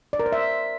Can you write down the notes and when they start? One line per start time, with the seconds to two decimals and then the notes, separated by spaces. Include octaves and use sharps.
0.13 D5
0.20 A#4
0.26 C5
0.32 E5